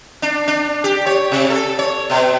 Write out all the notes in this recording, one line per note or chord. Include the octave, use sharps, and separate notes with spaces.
D4
D4
G4
C#5
C3
A4
C#5
B2